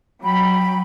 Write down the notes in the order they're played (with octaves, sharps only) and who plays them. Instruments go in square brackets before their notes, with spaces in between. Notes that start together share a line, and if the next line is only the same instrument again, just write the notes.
[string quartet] F#3 G5 [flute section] B5